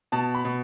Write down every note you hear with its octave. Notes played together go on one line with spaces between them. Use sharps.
B2 A5
B5
B2